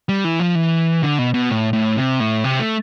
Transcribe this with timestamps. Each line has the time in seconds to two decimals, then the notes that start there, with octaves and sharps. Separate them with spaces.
0.09 G3
0.24 E3
0.40 F3
0.55 E3
1.03 D3
1.19 B2
1.34 B2
1.50 A2
1.73 A2
1.97 C3
2.20 A2
2.44 C3
2.60 A3